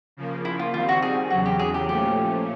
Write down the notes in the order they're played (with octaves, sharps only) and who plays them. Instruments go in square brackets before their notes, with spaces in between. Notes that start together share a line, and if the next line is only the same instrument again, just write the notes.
[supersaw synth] C#3 F3 A#3
[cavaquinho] E4
F4
[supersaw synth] D#3 G3 C4 [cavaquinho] F4
[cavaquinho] F#4
G#4
[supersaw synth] E2 C#3 F#3 [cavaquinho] F#4
[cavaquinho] G4
G#4
G4
[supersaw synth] A#2 F3 A3 C#4 [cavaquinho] G4